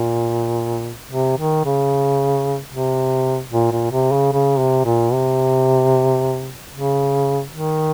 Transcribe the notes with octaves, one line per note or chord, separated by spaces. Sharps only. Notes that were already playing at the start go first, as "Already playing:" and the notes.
Already playing: A#2
C3
D#3
C#3
C3
A#2
A#2
C3
C#3
C#3
C3
A#2
C3
C#3
D#3